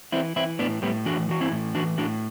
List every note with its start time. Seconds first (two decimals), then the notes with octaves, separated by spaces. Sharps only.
0.12 E3 C4 E4
0.36 E3 C4 E4
0.59 A2 B3 D4
0.82 A2 G3 B3
1.06 E3 D4 F#4
1.29 E3 F#4
1.41 C4 E4
1.52 A2
1.75 E3 D4 F#4
1.98 A2 D4 F#4